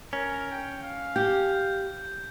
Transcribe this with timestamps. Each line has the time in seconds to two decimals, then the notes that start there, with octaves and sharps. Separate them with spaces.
0.13 C#4 A#4
0.51 G5
0.83 F5
1.16 G4 G6